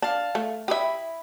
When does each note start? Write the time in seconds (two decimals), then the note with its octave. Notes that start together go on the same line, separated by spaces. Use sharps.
0.02 D4 F5 A5
0.35 A3
0.68 E4 G4 E5 B5 D#6